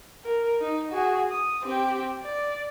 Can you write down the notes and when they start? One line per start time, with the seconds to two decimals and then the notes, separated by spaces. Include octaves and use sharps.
0.24 A#4
0.61 D#4
0.91 F#4 G#4
1.31 D#6
1.63 C4 G4
2.23 D5